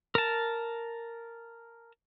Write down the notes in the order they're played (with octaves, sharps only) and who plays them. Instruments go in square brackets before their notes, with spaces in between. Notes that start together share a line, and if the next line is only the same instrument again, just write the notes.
[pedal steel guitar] A#4 A5